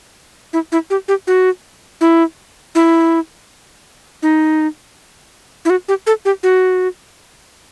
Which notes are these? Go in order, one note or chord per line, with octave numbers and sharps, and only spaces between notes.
E4
E4
G4
G4
F#4
E4
E4
D#4
E4
F#4
G4
A4
G4
F#4